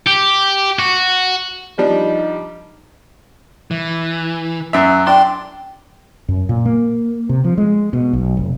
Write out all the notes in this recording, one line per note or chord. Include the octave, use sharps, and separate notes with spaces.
G4
F#4
F3 G3 D4 D#4
E3
F#2 E5
D4 G5 C6
F#2
A#2
A#3
C3
F3
G#3
B2
B1
F1